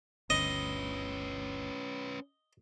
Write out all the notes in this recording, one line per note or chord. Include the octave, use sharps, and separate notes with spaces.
G1 D2 C#4 B4 D#5